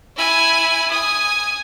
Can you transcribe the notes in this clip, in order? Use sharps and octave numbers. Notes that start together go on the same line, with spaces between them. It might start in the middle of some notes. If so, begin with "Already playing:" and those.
E4 G#5
G#5 D#6